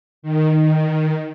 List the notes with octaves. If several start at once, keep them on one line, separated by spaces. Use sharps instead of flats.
D#3